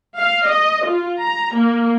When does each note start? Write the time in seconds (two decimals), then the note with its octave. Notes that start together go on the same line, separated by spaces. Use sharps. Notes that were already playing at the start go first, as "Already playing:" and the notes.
0.15 F5
0.46 D#5
0.84 F4
1.18 A#5
1.52 A#3